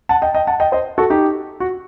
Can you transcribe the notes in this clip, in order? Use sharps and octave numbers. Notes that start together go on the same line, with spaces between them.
F#5 A5
D#5 G5
D#5 G5
F#5 A5
D#5 G5
C5 D#5
F#4 A4
D#4 G4
F#4